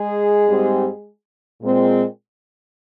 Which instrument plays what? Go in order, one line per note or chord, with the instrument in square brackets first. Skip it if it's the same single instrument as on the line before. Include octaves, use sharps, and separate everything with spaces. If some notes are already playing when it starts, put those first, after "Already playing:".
Already playing: [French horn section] G#3 G#4
G#2 G3 C4
A#2 G#3 C4